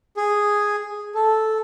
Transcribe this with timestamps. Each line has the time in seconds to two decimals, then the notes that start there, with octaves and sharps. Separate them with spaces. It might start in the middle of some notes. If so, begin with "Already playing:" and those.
0.17 G#4
1.15 A4